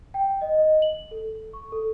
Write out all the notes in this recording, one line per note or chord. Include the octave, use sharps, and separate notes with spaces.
G5
D#5
D#5
F#7
A4
C#6
A4